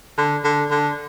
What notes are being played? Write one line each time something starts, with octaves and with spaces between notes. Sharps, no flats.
D3
D3
D3